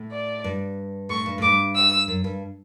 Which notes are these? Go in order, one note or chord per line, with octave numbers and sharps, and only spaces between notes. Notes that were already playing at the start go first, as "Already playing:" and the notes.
Already playing: A2
D5
G2
A2 C#6
G2
A2
G2 D6
E6
F#2
G2